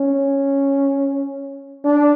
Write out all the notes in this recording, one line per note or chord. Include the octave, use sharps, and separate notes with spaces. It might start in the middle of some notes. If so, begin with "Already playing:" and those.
Already playing: C#4
D4